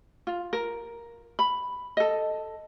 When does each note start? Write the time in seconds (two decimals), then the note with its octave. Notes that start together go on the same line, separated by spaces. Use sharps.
0.27 F4
0.53 A#4
1.39 B5
1.97 A4 D#5